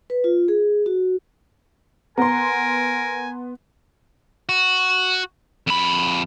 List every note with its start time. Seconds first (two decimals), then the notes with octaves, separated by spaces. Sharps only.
0.10 B4
0.24 F4
0.48 G#4
0.86 F#4
2.18 B3 A#4 G#5 A#5 C6
4.49 F#4
5.67 F2 B5